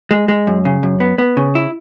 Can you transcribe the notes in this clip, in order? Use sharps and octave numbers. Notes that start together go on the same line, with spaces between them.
G#3
G#3
F#2
C#3
F#2
B3
B3
C#3
E4